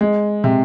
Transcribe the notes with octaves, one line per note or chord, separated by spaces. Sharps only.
G#3
C3